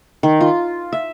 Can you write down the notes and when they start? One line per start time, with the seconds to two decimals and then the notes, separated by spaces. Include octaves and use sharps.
0.23 D#3
0.41 F4
0.92 E5